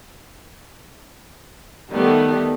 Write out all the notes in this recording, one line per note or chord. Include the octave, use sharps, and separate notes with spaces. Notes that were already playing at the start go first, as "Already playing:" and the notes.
D#3 G3 A3 B3